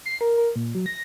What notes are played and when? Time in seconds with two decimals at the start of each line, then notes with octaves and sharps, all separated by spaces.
0.06 C7
0.21 A#4
0.38 A#4
0.56 A#2
0.75 F#3
0.86 A#6